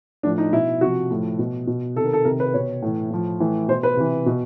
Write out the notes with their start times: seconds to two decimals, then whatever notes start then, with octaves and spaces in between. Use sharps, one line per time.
0.23 A2 F3 D4
0.38 D#4
0.52 B2 E4
0.81 C3 F3 F#4
1.11 A2 F3
1.39 B2
1.67 B2
1.96 C3 A4
2.00 D#3
2.06 A#4
2.13 A4
2.25 C3 D#3 A#4
2.40 B4
2.54 B2 C#5
2.82 A2 E3
3.10 A2 F3
3.40 A2 E3
3.68 B2 C5
3.83 B4
3.97 C3 E3
4.26 B2